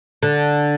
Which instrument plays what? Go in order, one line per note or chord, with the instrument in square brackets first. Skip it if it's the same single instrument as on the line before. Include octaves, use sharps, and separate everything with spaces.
[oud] D3